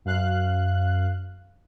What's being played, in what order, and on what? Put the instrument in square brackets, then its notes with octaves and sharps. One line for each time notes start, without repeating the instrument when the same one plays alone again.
[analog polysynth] F#2 F5 F#6